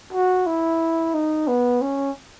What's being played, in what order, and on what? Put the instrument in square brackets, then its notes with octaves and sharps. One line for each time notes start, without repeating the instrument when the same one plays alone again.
[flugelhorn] F#4
E4
D#4
B3
C#4